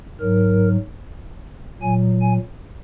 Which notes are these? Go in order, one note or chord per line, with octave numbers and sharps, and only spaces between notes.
G#2 F#3 A#4
A#2 F#3 G#5
G#5